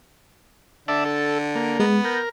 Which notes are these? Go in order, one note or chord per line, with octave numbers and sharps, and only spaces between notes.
D3 D5 E5 A5
A4
A#3
G#3 B3
A#4 G6 A#6